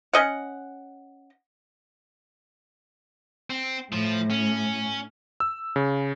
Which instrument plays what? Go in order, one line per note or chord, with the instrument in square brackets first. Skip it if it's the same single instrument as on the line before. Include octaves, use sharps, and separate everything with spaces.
[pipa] C#4 D#5 F#5
[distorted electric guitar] C4
[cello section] A2 [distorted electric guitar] F3
[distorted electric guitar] C#4
[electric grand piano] E6
C#3